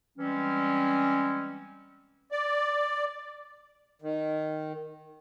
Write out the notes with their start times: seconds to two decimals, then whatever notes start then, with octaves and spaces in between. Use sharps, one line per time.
0.18 E3 G3 G#3 C4 C#4
2.32 D5
4.02 D#3